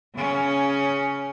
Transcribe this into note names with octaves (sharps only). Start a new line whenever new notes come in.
C#3 C#4